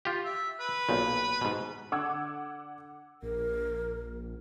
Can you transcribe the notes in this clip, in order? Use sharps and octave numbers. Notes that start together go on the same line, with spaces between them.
F4 G4
E5
B4
B1 A#2
G#2 B2
D3 F#5 D6 E6 G#6
A#1 A#4